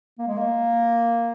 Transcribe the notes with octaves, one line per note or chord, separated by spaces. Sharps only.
A#3
G#3
A#3